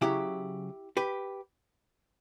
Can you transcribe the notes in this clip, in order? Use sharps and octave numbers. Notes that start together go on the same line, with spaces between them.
C#3 F#3 E4 G4
G4 B4